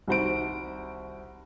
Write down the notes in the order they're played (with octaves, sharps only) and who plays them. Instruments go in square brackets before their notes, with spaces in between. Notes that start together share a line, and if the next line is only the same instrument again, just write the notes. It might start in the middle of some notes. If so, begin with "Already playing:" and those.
[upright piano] C2 D#3 F#4 C5 B5 D7